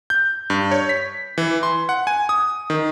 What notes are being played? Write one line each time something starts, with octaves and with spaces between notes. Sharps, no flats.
G6
G2
C#5
B6
E3
C6
F#5
G#5
D#6
D#3